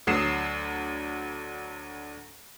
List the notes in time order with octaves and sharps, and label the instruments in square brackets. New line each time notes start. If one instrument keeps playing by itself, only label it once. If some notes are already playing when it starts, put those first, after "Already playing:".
[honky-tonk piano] D2 F#3 D#6 C7 E7